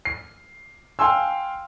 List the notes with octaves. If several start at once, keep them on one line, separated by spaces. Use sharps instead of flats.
C7
F5 G5 G#5 C6 E6